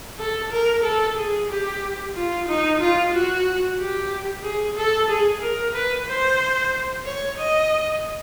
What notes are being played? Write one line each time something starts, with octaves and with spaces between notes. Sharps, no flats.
A4
A#4
A4
G#4
G4
F4
D#4
F4
F#4
G4
G#4
A4
G#4
A#4
B4
C5
C#5
D#5